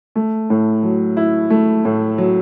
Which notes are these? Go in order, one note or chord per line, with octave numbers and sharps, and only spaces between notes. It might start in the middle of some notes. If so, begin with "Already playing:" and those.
A3
A2
F#3
E4
A3
A2
F#3